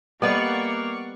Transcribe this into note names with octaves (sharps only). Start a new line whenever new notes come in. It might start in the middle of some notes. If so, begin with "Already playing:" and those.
G3 A#3 B3 A4 D5 D#5 F#5 C#6